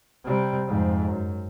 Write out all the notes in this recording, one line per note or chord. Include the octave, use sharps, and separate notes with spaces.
C3 G3
F2 G#2
F#2